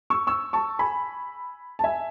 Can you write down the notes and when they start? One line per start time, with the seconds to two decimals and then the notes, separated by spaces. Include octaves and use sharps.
0.10 C#6 E6
0.27 C#6 E6
0.53 A5 C#6
0.79 G#5 B5
1.79 A5
1.84 E5 G#5